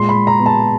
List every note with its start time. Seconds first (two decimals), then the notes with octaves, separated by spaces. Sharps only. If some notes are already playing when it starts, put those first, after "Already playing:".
Already playing: A#2 G#3 C6
0.09 B5
0.15 G#3
0.27 A#5
0.40 B3
0.46 A5